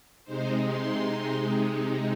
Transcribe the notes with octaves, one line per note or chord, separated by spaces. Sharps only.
C3 G#3 D#4 C5
C6